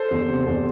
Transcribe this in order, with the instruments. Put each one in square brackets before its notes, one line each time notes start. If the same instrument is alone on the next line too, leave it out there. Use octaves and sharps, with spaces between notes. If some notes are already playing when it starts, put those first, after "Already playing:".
Already playing: [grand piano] A4 C5
[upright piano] E2
C3
E2